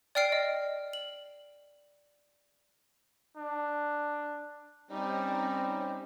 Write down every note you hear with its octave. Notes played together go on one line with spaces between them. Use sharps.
D5 G5 F6 C7 D7
D#5
F#7
D4
G3 C4 C#4 D#4